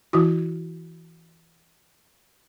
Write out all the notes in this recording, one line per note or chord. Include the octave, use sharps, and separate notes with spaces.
E3 E4 F#4